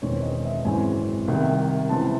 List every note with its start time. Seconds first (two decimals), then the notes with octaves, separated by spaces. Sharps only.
0.02 E1 E2 D#3 G#3 C4 C#5
0.23 D#5
0.45 E5
0.64 G#1 F#2 E3 G#3 C4 G#5
1.28 C2 C3 D#3
1.89 C#2 C3 E3 C4 A5